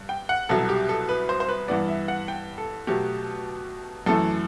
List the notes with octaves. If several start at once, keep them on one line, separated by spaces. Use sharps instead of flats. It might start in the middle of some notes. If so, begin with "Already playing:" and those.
Already playing: G2
G5
F#5
C2 B2 F#3 A4
G4
A4
B4
C5
C5
B4
G2 E3 B3 D5
E5
F#5
G5
A4
B2 F#3 A3 G4
F#2 E3 A3 A4